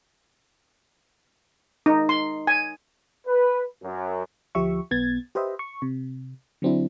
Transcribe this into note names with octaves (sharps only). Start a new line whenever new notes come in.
D#4
C6
G#5
B4
F#2
D2 F3 G4 E5 C#6
B1 B3 G#6 A6
G4 B4 C5 D#5 E5
C#6
C3
D3 F#3 C4 D4 E4